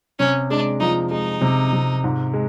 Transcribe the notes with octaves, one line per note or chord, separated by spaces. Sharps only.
C3 C#4
G#3 D4
F3 D#4
G#3 D#4
C3
C3
G#2
G#3